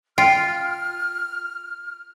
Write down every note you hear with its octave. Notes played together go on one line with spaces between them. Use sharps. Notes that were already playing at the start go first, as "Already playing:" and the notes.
F4 G5 F6